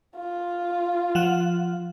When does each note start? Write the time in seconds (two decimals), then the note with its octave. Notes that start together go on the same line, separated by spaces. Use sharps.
0.16 F4
1.15 F3 F#5